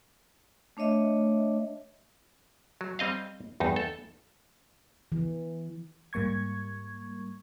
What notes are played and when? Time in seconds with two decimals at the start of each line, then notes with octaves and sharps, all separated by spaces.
0.77 A3 D4 C#5 D#5 E5
2.81 F#3
2.99 G3 C4 D#5 F5
3.60 E2 G2 D#4
3.76 A4
5.12 E3
6.13 G#2 G3 A#3 C#6 G#6